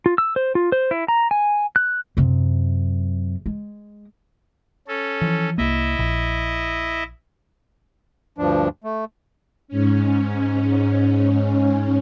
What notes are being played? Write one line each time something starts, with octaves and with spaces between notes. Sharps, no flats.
F4
E6
C5
F4
C5
E4
A#5
G#5
F#6
F#2 C3
G#3
C#4 A4
E3 F3
C2 A#3 E4 D#5 E5
A#1
D2 G2 F3 D4
A3
G#2 C#4